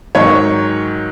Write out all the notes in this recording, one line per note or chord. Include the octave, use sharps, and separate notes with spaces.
G#2 D#3 F#3 C#5